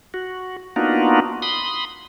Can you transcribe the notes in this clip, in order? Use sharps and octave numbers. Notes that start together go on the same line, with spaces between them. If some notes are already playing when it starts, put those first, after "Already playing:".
F#4
A#3 B3 D4 D#4 F4 F#4
B5 C6 D#6